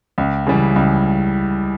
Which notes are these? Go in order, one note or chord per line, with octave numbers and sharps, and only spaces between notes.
C#2
C#3 E3 G3
C#2